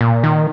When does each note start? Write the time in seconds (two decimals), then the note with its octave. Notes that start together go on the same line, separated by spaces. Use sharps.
0.01 A#2
0.23 D#3